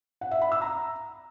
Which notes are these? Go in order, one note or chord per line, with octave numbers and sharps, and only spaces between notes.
F#5
E5
B5
E6
A#5